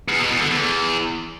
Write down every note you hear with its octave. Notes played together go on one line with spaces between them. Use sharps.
E2
B2
E2
D3
E2